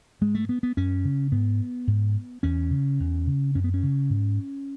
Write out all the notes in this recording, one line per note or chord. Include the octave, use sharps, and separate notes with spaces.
G#2 G#3
A3
B3
B3
F#2 C#4
C#3
G#2 B3
G#2
E2 C#4
C#3
E2
C#3
F#2 C#4
B3
C#4
C#3
G#2